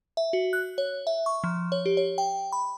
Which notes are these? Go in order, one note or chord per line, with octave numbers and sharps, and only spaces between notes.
E5
F#4
F#6
C#5
E5
C#6
F3
C#5
G4
C#5
G5
B5